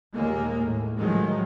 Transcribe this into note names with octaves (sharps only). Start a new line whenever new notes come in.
D#2 A#2 G#3 A#3
A2
A2 D#3 F3 F#3 G#3